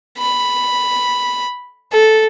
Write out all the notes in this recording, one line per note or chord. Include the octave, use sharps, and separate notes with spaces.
B5
A4